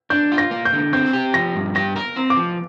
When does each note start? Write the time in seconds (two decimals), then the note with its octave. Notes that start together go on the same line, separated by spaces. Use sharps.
0.10 D4 G6
0.32 F4
0.38 A#6
0.51 A#3
0.65 G6
0.73 D3
0.93 C4 G6
1.13 G4
1.34 F3 A#6
1.55 G2
1.75 G4 A#6
1.96 A#4
2.16 C4
2.30 D6
2.37 F3